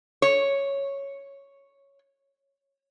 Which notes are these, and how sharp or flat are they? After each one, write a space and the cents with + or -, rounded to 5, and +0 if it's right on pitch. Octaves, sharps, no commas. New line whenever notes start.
C#5 +0